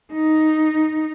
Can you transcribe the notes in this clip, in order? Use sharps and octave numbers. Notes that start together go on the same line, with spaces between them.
D#4